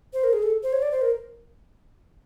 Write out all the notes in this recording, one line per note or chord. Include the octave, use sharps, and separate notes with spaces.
C5
A#4
G#4
A4
C5
C#5
D5
C5
A#4